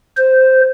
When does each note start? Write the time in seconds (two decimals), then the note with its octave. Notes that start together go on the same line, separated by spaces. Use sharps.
0.17 C5